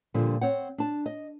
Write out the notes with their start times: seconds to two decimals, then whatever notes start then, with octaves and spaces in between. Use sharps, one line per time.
0.14 A#2 D3 F3 G3
0.41 C4 C#5 F#5
0.78 D4 A5
1.06 D#5